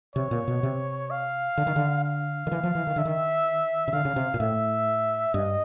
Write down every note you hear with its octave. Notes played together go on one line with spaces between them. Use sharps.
C3 C#5
A#2
B2
C3
F5
D3
D#3
D3
F5
D#3
E3
F3
E3
D#3
D3 E5
D#3
C#3
D3 F5
C#3
C3
A#2
A2 E5
G2 D#5